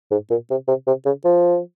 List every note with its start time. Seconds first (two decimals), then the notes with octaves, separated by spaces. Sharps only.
0.11 G#2
0.30 A#2
0.50 C3
0.68 C3
0.87 C3
1.06 C#3
1.25 F3